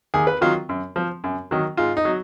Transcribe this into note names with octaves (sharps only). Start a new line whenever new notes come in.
D#2 G#4
B4
D#3 F#3 F4
F#2
F3
F#2
D#3 F#3
G#2 F4
D#4
F#3